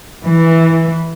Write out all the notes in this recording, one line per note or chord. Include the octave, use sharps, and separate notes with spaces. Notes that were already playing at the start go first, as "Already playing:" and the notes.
E3